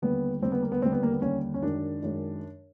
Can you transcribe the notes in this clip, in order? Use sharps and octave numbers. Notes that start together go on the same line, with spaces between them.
D#2 D3 G3 B3
D#2 D3 G3 C4
B3
A#3
B3
D#2 D3 G3 C4
B3
A#3
B3
D#2 D3 G3 C#4
C#4
F#2 D#3 G#3 D4
F#2 D#3 G#3